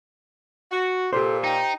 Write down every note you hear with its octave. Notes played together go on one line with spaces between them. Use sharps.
F#4
A#2 G4 A4 C5
D#4 G5